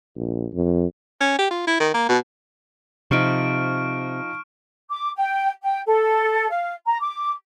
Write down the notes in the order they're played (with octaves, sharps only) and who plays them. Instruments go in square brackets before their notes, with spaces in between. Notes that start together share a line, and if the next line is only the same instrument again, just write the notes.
[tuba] A#1
F2
[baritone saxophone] C#4
G4
F4
E4
D#3
A#3
B2
[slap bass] C3 [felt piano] F3 D#4 [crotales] C#6 F6 D7
[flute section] D6
G5
G5
A4
F5
A#5
D6